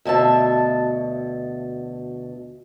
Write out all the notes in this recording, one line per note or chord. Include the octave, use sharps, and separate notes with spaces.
D2 B2 E5 A5